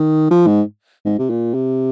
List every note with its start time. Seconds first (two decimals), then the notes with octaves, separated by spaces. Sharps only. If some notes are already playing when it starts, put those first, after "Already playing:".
Already playing: D#3
0.31 F3
0.47 G#2
1.05 G#2
1.19 C3
1.30 A#2
1.54 C3